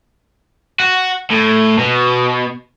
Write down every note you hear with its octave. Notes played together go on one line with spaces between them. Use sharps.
F#4
A2
B2